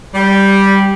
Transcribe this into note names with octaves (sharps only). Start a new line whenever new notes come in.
G3